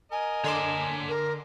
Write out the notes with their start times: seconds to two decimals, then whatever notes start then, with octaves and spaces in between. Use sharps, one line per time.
0.12 A#4 D#5 G#5
0.44 D3 C#5 A5 C6 D6
1.09 A#4